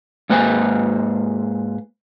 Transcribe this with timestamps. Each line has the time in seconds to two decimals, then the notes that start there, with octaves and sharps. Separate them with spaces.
0.30 G#2 A#3 B4 C5 G#5